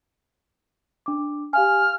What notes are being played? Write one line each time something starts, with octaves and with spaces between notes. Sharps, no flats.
D4 D6
G4 F5 G#5 F6